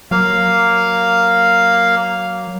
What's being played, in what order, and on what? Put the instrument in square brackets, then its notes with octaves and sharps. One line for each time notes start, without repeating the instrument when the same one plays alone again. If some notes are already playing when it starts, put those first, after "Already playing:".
[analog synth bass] F#3 [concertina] A#3 F5